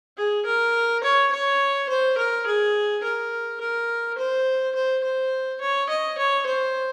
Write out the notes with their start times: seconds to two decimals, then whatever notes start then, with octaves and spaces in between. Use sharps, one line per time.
0.17 G#4
0.45 A#4
1.03 C#5
1.32 C#5
1.89 C5
2.18 A#4
2.46 G#4
3.03 A#4
3.60 A#4
4.18 C5
4.75 C5
5.04 C5
5.61 C#5
5.89 D#5
6.18 C#5
6.46 C5